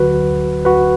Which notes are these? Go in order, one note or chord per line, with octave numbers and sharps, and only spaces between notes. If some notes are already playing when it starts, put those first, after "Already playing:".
Already playing: D2 D3 F#3 F#4 B4
F#4 B4